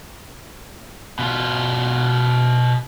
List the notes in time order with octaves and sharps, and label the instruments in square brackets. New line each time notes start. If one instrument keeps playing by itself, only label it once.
[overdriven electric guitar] B2 F4